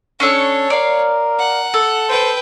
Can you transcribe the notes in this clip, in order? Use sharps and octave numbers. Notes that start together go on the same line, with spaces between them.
C#4 D4 A4 C#5
A#4 D5 F5
F#5
A4
B4 C5 G5